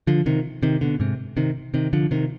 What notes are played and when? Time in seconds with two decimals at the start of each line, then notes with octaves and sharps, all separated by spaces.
0.07 D3 F3
0.26 C3 D#3
0.63 C3 D#3
0.81 B2 D3
1.00 G#2 C3
1.37 C3 D#3
1.74 C3 D#3
1.93 D3 F3
2.11 C3 D#3